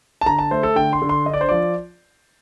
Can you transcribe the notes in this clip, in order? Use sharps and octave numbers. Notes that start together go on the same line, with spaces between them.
A5
D3 A#5
A5
A3 C5
A4
D3 G5
C6
D3
C6
D4 D#5
D5
C5
F3 D5